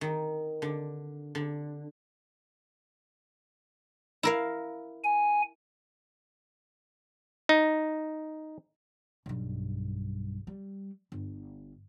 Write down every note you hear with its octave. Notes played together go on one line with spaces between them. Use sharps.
D#3
D3
D3
E4 A#4 F5
G#5
D#4
B1 G2
G3
G1